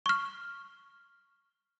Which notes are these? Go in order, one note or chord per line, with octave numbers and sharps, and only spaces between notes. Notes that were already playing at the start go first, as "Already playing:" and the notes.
C#6 F6